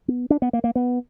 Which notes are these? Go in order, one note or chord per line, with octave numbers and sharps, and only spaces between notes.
B3
D4
B3
A#3
A#3
B3